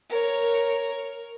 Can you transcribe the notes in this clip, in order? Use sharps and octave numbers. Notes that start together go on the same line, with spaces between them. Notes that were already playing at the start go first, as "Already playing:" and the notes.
A#4 C#5